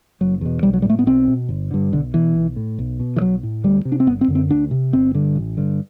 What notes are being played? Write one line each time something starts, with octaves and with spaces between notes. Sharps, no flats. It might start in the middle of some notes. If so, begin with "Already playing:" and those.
F#1 F#3
E2 B2
B1 G3
F#3
A2 G3
A3
B3
B1 C4
B2
G1
G2 D3
B1 D3
B2 E3
B1
A2
B1
B2
E3
B1 F#3
A2
D2 G3
C3
D4
C4
G1 B3
C4
F#2 D3
C4
D2 D4
C3
G1 C4
G2 D3
A1
G2 D3